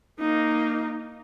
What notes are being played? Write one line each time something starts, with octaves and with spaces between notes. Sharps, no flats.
A#3 D#4